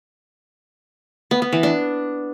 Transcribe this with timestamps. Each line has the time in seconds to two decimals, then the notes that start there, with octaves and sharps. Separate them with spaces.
1.31 B3
1.42 B3
1.53 E3
1.63 D4